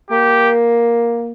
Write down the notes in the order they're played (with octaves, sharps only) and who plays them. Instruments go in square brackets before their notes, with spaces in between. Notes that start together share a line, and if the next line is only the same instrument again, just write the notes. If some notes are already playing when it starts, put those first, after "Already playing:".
[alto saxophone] A#3 [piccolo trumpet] G4